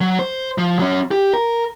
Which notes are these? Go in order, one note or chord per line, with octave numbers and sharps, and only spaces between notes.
F#3
C5
F3
F#3 C#4
G4
A#4